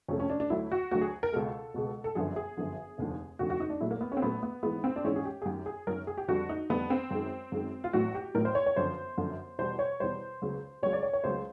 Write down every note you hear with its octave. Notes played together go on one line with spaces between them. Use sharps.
F2 C3 F3 A3 C#4
C#4
D4
D4
D2 D3 F#3 E4
F#4
D2 D3 F#3 F#4
G#4
A#4
C#2 B2 G#3 A4
C#2 B2 G#3
A4
G1 F#2 D3 F3 G#4
G#4
G1 F#2 D3 F3
F1 D#2 D3 F3
F1 D#2 D3 F3 F#4
F#4
D#4
D4
A#1 A#2 F#3 A3 E4
A#3
B3
C#4
C4
A#1 A#2 F#3 A3 B3
B3
G#1 G#2 E3 G#3 B3
C4
D4
G#1 G#2 E3 G#3 C#4
G#4
G4
G#4
F#2 D#3 F#3 G4
G#4
F#2 D#3 F#3 A#4
G#4
G4
F2 D3 G3 F#4
D#4
F2 D3 G3 B3
C4
F#2 D#3 G#3
F#2 D#3 G#3
F4
A1 A2 F#3 F#4
G4
A1 A2 F#3 A#4
C5
C#5
C#5
G1 F#2 D3 F3 C5
G1 F#2 D3 F3
E2 B2 G3 C5
C#5
E2 B2 G3 C5
C#2 C#3 F#3
C#2 C#3 F#3 C#5
D5
C#5
C#5
C#2 C#3 F#3 C5